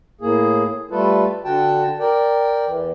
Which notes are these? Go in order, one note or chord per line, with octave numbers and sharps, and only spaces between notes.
A2 A#3 G#4
G3 A3 F4 A4 B4
D3 F#4 G5 A5
A#4 D5 G5
E2 E3